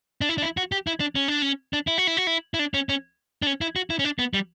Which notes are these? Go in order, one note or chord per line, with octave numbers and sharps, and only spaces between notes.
D4
E4
D4
E4
F#4
G4
E4
D4
C#4
D4
C#4
D4
E4
F#4
E4
F#4
E4
E4
D4
C#4
C#4
D4
C#4
E4
F#4
E4
C#4
D4
B3
G3